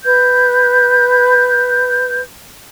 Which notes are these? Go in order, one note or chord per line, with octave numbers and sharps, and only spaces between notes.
B4 G6